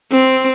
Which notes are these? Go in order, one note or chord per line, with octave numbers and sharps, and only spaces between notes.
C4